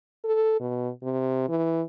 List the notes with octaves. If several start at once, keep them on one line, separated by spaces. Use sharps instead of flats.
A4
B2
C3
E3